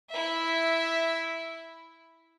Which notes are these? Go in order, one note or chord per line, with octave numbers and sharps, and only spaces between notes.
E4 E5